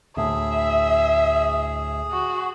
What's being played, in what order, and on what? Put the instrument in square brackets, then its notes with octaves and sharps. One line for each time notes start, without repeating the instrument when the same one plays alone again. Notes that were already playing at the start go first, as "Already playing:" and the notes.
[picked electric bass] D2 A2 [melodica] G#4 [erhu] E5
[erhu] F#4